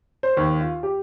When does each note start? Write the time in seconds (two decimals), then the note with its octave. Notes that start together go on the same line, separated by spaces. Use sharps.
0.23 C5
0.37 D#2
0.61 F4
0.83 G4